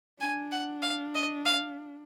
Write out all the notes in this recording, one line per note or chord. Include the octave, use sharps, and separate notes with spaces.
D4 G#5
F#5
F5
D#5
F5